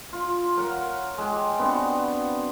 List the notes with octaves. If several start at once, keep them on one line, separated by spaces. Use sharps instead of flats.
F4
A#4 C#5 F5 F#5
G#3 G4
B3 C4 D4 F#4